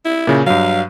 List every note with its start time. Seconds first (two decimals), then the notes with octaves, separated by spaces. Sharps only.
0.05 E4
0.27 A#2 C#3
0.46 G2 F#3 F5